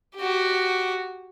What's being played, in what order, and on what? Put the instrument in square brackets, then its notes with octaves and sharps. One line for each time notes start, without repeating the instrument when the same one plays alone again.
[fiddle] F#4 G4